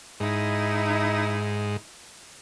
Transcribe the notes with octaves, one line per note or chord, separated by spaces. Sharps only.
G#2 D#4 E4